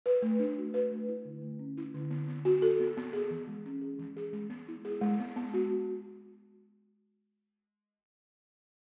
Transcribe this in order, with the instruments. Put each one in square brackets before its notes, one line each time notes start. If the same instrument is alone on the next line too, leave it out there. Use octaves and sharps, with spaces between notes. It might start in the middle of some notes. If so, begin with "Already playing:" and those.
[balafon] B4
A3
D4
F#4
B4
A3
E4
D3
A3
C#4
E4
D3
B3
B3
F#4
A4
B3
B3
G#4
E3
G#3
C#4
G#4
E3
G#4
G#3
B3
E4
G#4
G#3
B3
B3
F#4